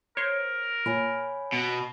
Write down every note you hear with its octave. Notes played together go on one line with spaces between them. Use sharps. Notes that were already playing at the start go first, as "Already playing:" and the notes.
A#4 C5 C#5
A#2 C#5 G#5 B5
B2